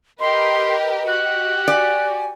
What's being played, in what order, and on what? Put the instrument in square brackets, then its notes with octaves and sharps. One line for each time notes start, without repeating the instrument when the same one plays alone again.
[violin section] G4 A#4 B4 [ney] D#5 [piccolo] C6
[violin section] F#4 G4 [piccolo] F#6
[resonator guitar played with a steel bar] D5 [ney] G#5